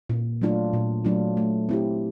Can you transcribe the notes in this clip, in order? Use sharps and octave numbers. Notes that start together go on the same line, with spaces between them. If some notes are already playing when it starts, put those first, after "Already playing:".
A#2
F#3 A3 D4 F4
A#2
F#3 A3 D4 F4
A3
C4 E4 G4